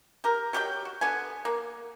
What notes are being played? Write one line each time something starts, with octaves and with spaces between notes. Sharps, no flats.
G4 A#4
F#3 G4 A#4 G5
F#4
D3 B3 G#5
A#3